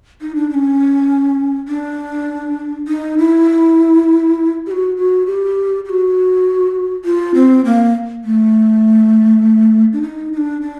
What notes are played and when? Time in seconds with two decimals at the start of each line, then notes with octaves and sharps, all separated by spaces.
0.21 D#4
0.35 D4
0.50 D4
0.54 C#4
1.68 D4
2.88 D#4
3.18 E4
4.66 G4
4.71 F#4
4.96 F#4
5.26 G4
5.85 G4
5.89 F#4
7.05 F4
7.34 C4
7.65 A#3
8.24 A3
9.93 D4
10.02 D#4
10.33 D#4
10.37 D4
10.62 D4